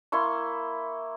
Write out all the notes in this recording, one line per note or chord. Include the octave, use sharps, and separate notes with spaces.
A#3 E4 C6 C#6